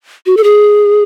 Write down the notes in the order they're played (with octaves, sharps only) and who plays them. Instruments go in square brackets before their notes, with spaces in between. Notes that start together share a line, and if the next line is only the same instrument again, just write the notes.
[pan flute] F#4
A4
G#4